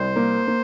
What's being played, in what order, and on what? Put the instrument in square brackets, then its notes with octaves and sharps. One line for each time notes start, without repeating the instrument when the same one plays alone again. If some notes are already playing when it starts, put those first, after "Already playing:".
Already playing: [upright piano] C2 [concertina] C5
[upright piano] A#3
A#3